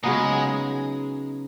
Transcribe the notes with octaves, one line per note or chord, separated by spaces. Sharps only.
C#3 F#3 G#3 B3 D#4